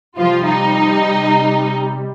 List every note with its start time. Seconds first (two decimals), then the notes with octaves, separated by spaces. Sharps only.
0.17 C3 F3 G3 F4
0.46 D#4